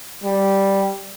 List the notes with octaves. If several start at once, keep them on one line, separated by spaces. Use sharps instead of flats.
G3